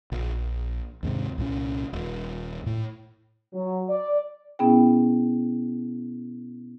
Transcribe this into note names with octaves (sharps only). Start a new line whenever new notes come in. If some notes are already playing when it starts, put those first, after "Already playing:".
A#1
D#2 G#2 C3
C2 A#2 C#4
D#1
A2
F#3
D5
B2 B3 C#4 E4 G#4 G5